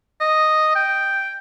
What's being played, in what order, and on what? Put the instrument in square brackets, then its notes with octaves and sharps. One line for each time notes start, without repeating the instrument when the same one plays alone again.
[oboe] D#5
G5